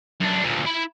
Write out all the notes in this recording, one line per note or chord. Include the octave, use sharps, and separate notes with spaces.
F#2 D4
D2 A#2
E4 B5